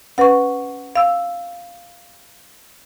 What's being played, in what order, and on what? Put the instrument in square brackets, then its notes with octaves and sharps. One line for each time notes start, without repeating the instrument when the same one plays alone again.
[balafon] C#4 B4 [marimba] F#5 C#6
[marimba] F5 E6